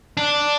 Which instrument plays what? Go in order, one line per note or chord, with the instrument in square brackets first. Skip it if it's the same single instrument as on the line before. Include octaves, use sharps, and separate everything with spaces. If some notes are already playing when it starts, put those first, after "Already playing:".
[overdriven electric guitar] D4